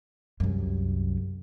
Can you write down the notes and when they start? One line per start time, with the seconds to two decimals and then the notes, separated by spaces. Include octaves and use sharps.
0.40 C2 F#2